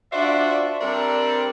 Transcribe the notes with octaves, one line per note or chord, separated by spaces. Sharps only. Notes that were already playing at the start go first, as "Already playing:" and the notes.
D4 F4 F#4 C5 D5 E5
G3 C4 D4 A4 A#4